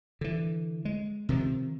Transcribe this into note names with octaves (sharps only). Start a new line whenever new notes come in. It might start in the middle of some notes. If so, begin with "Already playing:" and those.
D3 E3
G#3
C3 D#3 F3